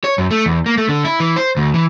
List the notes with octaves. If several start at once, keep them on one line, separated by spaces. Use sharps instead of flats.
C#5
F#2
A3
E2
A#3
A3
D3
E4
E3
C5
D2
E3